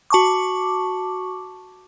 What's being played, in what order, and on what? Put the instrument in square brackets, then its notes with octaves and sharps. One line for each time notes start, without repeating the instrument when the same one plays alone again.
[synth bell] F#4 A5 C#6 D6